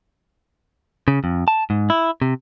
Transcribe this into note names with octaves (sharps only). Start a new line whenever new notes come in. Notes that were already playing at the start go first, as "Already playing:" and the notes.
C#3
F2
A5
G#2
E4
C3